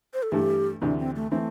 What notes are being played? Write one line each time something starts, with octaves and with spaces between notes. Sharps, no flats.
C5
A4
G2 E3 A3 G4
D2 C3 E3 D4
C4
A3
E3 A3 C4